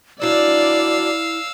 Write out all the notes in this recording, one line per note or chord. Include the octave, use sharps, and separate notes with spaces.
F#3 D4 E4 D5 F5 E6